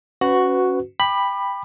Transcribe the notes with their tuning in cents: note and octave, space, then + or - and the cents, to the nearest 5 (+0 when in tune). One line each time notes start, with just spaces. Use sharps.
C#4 +0 F#4 +0 B4 +20
G5 +15 B5 +0 D6 +35